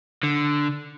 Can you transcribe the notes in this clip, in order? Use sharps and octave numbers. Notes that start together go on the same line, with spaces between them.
D3